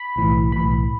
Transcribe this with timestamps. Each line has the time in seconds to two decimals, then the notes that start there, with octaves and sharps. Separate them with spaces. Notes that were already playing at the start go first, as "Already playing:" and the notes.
Already playing: B5
0.16 B1 A2 E3
0.52 B1 A2 E3 B5